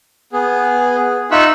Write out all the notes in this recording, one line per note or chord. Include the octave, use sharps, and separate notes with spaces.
B3 G#4
D#4 F4 E5 C#6 E6 F#6